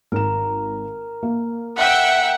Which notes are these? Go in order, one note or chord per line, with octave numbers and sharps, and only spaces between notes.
G#1 A#4 E7
A#3
E5 F#5 G5 E6